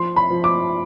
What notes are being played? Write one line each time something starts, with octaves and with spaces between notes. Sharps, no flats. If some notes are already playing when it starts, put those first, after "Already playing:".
Already playing: F3 C6
B5
F3
D6